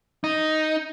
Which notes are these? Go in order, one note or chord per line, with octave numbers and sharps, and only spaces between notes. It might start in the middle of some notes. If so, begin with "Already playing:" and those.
D#4